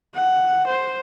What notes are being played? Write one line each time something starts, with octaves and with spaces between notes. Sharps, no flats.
F#5
C5